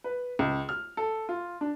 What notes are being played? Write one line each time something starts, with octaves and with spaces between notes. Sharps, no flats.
B4
C#2
F6
A4
F4
D4